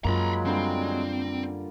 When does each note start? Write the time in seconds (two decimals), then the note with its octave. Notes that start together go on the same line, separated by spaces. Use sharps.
0.04 F#2 F#3 G#3 A#3 F4 A#5 B5
0.46 D3 G3 C4